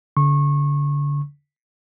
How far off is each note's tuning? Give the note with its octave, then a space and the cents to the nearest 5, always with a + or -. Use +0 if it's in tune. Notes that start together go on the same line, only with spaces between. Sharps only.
D3 -35 C#6 -25